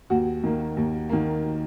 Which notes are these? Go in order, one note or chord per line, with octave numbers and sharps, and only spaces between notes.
D#2 F#4
D#3 A#3
D#2
D#3 A#3